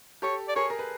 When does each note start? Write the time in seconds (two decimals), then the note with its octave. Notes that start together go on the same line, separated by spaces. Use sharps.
0.22 G4 A4 C#5
0.48 D5
0.56 G#4 A#4 C#5
0.70 A#4
0.79 B4